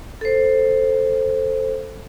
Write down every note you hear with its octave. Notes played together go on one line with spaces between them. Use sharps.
A4 C5